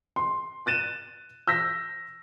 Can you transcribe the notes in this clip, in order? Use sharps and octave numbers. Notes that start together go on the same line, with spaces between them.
C6
F#6 A6 D#7 E7
E6 G6 A#6 B6